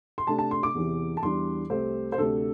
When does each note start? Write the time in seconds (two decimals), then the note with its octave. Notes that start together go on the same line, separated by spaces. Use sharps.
0.18 C6
0.27 C3 A3 D4 A5
0.39 A5
0.51 C6
0.63 D6
0.74 E2 C3 E3
1.17 A5
1.22 E2 E3 G3 D4 C6
1.70 C2 C3 A3 C4 C5
2.12 C5
2.18 D2 C3 A3 D4 A4